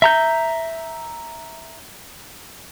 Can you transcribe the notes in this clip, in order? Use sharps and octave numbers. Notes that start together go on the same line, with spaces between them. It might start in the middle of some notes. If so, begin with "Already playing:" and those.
E5 A#5 G6